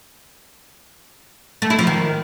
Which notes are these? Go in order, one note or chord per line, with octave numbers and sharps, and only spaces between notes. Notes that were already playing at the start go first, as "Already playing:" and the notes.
A3
E4
F3
D#3